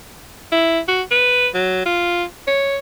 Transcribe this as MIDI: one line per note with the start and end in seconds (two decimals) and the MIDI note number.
0.52 0.80 64
0.88 1.02 66
1.11 1.48 71
1.54 1.84 54
1.86 2.24 65
2.47 2.78 73